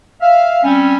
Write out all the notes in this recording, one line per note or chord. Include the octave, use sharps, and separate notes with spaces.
E5 F5
G3 C4 C#4